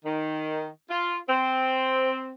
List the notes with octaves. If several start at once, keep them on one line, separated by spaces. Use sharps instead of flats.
D#3
F4
C4